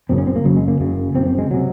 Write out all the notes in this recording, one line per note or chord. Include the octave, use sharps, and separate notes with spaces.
F#1 F#2 C#3 C4
C#4
C4
A#3
F#1 F#2 C#3 F#3
G#3
A#3
F#1 F#2 C#3
F#1 F#2 C#3 C4
C4
G#3
C3 F#3